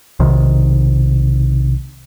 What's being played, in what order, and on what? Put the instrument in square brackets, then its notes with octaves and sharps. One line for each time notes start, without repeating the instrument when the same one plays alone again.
[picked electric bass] B1 C3 D#3